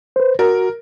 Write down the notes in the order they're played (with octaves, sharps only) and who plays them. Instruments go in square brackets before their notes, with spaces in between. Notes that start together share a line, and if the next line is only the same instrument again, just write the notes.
[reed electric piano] B4 C5
[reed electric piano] F#4 [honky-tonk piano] A#4